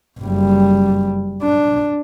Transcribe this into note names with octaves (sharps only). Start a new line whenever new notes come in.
F#1 G3
D4